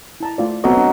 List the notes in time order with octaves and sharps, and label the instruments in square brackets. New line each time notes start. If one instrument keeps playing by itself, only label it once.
[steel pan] E4 A5 A#5
A3 F4 D5
[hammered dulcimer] F#3 D#5 [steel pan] B3 C4 A4
[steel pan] D4